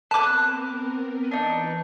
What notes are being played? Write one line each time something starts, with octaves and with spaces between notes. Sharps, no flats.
B3 C4 A#4 B4 A5 D6 F#6
E3 D4 D#4 B4 C#6